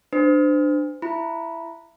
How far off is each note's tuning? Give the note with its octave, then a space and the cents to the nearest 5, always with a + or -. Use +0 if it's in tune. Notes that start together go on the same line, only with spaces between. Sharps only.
D4 +20 C5 -30
E4 +15 B5 -15